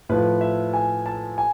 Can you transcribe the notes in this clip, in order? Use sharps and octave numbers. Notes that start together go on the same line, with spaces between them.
A2 F3 B4
E5
G#5
A5
G#5